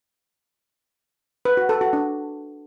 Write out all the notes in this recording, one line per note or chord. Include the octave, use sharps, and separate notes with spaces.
B4
F#4
A4
F#4
D4